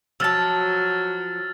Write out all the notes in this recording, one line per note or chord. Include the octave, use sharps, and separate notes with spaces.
F3 F#3 A5 E6 F6 A6